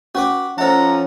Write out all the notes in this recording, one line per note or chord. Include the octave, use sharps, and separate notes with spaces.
C#4 F#4 B4 D6
F3 C#4 A4 C5 D#5 E5 F#5 A#5